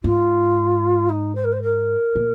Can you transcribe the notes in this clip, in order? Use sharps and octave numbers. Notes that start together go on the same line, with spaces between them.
G#2 F4
D#4
C5
A#4
C5
A#4
A#2